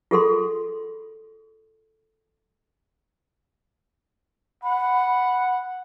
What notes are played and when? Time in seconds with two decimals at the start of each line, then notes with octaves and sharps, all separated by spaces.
0.11 F4 G#4 A4 C6
4.64 F#5 B5